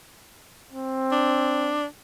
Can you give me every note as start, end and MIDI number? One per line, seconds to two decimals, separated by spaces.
0.72 1.80 60
1.12 1.85 62